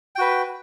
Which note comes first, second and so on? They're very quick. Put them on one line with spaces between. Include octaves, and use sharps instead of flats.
G5 F#4 B4